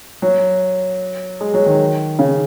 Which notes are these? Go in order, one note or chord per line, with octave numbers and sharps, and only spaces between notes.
F#3
G#3
F#3
D#3
C#3